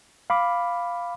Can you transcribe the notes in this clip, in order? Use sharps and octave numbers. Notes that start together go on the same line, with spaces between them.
F5 B5 D6